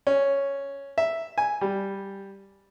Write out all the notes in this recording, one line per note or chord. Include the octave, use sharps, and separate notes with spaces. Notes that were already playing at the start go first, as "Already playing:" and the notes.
C#4
E5
G#5
G3